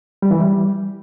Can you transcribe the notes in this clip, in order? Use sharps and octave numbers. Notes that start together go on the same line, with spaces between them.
G3
E3
G3